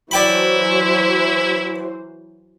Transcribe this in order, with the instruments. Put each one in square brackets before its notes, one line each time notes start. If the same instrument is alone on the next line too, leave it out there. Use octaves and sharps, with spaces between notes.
[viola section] E3 F#3 C5 [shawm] E4 [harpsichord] D5 G5 B5